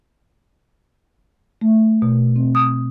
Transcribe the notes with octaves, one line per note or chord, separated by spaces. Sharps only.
A3
B2
C4
D#6